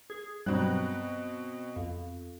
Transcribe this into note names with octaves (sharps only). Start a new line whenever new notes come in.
G#4
G2 B2 F#3 G3 C4 F#6
F2